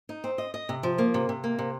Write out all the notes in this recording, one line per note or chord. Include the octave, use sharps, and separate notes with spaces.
D#4
C4
D#5
D#5
C3
F3
A#3
C3
C3
A#3
C3